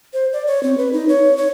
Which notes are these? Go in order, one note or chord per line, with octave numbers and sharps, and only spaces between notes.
C5
D5
C#5
C4
B4
D#4
C#5
C#5